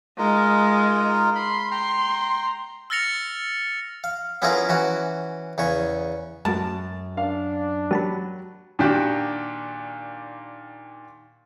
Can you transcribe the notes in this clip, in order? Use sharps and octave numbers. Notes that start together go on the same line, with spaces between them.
G#3 D#4 F4 A#4
B5 C6
G5 A#5 C6
E6 F6 A6 A#6 C#7 F7
F5
B3 C#4 E4 F4 G#4 A#4
E3 C#4 F#4
E2 C#3 C#5
F#2 G#3 A3 F#4 A5
D4 F5
F#3 G4 A5 B5
A#2 D#3 D4 F#4 G4